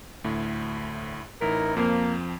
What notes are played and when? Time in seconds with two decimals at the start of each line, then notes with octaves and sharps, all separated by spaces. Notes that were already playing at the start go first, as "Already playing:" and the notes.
0.24 D2 A2
1.41 A1 D#4 E4 A#4 B6
1.77 F2 F3 A#3 C4